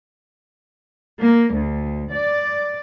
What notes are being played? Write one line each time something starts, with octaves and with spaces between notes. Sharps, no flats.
A#3
D2
D5